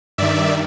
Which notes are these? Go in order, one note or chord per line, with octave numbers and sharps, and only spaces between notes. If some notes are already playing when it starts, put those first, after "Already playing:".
G2 D#3 D5 E5